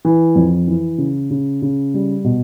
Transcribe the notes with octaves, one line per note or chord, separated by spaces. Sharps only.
E3
F2
E3
C#3
C#3
C#3
G3
B2